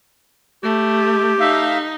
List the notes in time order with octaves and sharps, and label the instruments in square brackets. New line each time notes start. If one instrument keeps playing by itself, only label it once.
[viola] A3 [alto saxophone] G4
[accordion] A3 E5 F5 [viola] D#4